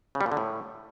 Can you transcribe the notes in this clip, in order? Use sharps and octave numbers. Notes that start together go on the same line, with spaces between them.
C#3
G3
A#2
D3
A2